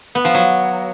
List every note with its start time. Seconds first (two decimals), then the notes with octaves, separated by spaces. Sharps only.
0.15 B3
0.25 F3
0.34 F#3